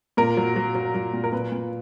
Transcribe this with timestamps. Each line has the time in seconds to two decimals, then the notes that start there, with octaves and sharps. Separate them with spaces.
0.17 A#2 A#4
0.37 F#3
0.56 F#3
0.75 F#3
0.95 F#3
1.13 A#2
1.24 A#4
1.32 A#2 B4
1.52 A#2